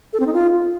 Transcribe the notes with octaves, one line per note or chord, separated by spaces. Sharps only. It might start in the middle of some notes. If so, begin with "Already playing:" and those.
A4
C4
D#4
F4